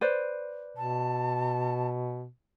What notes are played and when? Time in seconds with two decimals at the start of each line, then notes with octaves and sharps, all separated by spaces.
0.01 B4 C5 D5
0.77 B2 A5